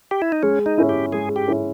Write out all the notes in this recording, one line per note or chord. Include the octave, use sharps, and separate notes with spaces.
G4
E4
D#4
G#3 C#4
D#4
C#4 E4
G4
G#3 G#4
G4
C#4 E4